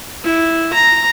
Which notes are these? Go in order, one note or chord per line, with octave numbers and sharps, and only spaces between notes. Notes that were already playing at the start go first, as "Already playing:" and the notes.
E4
A#5